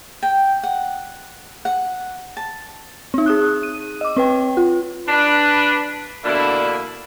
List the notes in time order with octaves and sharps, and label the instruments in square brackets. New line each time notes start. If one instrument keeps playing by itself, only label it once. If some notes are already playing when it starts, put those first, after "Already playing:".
[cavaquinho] G5
F#5
F#5
A5
[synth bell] C4 D#4
G#4 D#6 F#6
D#7
D#5 D6
C4 B4 G5
F4
[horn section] D4 B4
B2 D3 A#3 D4 E4